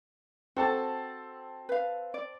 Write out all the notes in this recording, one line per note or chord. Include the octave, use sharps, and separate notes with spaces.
C4 F#4 A4 A5
B4 F5
D5